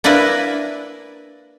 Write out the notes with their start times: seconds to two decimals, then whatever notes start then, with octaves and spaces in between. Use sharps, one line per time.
0.04 A#3 D4 E4 A#4 B4 G#5